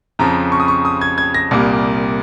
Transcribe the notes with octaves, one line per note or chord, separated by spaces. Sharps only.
F2 C#3 F3 A#5
C#6
D#6
C#6
D#6
G#6
G#6
A#6
C2 A#2 G3 A#3